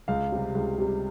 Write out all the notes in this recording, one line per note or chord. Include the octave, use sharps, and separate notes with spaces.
C#2 F5
C3 G3
C#2
C3 G3